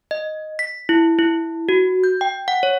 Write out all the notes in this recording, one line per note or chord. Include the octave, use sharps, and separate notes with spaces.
D#5
B6
E4
E4
F#4
G6
G5
F#5
C#5